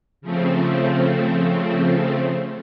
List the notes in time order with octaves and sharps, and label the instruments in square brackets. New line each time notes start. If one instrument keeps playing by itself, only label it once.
[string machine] C#3 F3 A3 C4